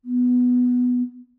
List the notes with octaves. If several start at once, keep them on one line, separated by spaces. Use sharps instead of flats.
B3